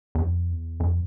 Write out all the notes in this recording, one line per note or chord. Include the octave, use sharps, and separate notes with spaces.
E2
F2
E2
F2